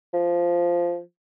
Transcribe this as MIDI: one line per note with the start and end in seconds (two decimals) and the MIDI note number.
0.14 0.99 53